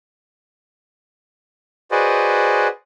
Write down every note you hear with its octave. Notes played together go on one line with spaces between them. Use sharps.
F#4 G#4 B4 C5 D5 D#5